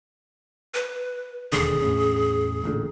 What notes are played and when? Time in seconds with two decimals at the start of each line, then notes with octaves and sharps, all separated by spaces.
0.74 B4
1.52 E1 D#2 D3 G#4
1.82 E2 A2 C#4
2.64 A1 A#2 D3